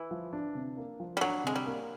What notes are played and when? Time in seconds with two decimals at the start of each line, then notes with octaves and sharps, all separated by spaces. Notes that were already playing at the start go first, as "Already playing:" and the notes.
Already playing: E3
0.11 F3
0.33 D4
0.55 C3
0.77 A#3
1.00 F3
1.17 G3
1.21 F#3 D4
1.44 C3 G#3
1.56 G3
1.66 A#3